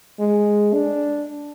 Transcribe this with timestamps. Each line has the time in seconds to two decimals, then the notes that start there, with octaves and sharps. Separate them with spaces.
0.20 G#3
0.74 D4